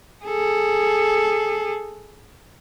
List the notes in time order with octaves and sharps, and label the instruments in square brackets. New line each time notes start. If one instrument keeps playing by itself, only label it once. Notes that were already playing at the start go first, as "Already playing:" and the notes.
[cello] G#4 A4